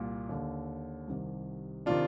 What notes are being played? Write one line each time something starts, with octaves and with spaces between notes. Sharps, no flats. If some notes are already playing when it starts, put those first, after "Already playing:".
Already playing: C2 A#2
D#2 D3
C2 C3 D#3
C3 D#3 D4 F4